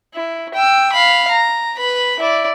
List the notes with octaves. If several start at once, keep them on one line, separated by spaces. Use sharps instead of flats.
E4
G5 E6
F5 B5
A#5
B4 B5
E4 D5